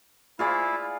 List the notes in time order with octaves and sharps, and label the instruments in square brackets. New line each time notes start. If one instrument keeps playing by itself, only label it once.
[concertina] E4 [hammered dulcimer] F4 G#4 D5